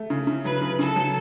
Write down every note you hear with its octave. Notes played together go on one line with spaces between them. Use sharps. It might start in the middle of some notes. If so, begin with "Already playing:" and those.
Already playing: A3
C#3
C#3
F#3 B4
C#3
C#3 A4
F#3